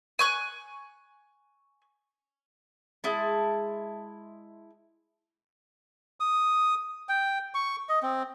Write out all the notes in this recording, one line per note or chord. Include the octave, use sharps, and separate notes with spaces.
G#5 C#6 F#6
G#3 E4 A5
D#6
G5
C#6
D#5
C4